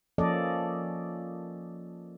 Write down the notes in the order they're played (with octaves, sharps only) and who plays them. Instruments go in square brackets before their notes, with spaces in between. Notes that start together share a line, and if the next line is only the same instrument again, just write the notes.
[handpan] F3 A#3 C#4 A4 D5 D#5